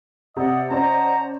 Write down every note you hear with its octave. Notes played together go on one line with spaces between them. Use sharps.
C3 D5 D#5 F#5
C#4 C5 D5 D#5 F#5 A5 A#5